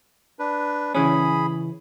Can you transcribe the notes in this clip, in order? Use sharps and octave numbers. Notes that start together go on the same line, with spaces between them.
D4 B4
C#3 E3 C#4 G#4 B5